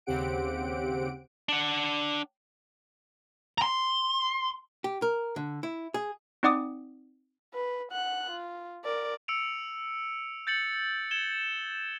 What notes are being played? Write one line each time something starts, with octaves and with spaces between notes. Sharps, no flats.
D#2 C#3 C4 G4 F#5 D7
D4 F#5
A#5 C6
G4
A#4
D3
E4
G#4
C4 D#4 D5 F#5 D6 D#6
B4
F#5 F#6
F4
A#4 D5
E6 C#7 D7 F7
G6 A6 C#7 F#7
G#6 E7 G7